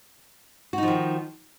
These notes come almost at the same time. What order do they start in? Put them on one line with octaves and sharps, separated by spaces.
F#4 D#4 F3 D#3